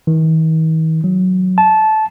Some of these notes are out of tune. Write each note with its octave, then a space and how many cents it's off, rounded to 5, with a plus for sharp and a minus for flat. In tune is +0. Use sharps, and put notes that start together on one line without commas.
D#3 +45
F#3 +0
A5 -15